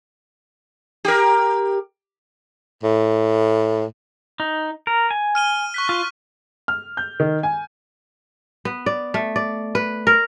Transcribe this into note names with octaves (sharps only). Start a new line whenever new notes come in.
G4 A#4
A2
D#4
A#4
G#5
F6 D#7 G7
C#6 F#6 B6
F4
F6
G6
D#3
G#5
B3
D5
A3
D5
B4
A#4